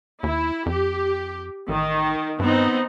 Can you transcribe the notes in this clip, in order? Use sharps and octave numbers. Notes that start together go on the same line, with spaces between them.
D#2 E4
F2 G4
A1 D#3
G2 B3 C4 D#4